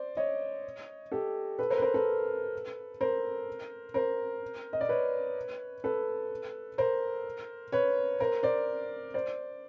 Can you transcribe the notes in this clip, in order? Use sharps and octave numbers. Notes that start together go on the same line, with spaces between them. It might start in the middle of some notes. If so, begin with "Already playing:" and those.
Already playing: C5 D5
C#5 D#5
G4 A4
A4 B4
A#4 C5
B4
A#4 C5
A4 B4
A#4 C5
A#4 C5
D#5
D5
B4 C#5
A4 B4
A#4 C5
B4 C#5
A#4 C5
C5 D5
C5 D5